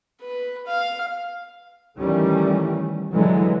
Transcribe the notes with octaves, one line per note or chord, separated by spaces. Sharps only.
B4
F5
D#3 E3 G3 A3 C#4
D3 E3 F#3 G#3